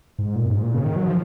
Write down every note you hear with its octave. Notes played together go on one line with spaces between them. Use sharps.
G#2
A#2
F#2
G#2
A#2
C#3
D#3
F#3
F3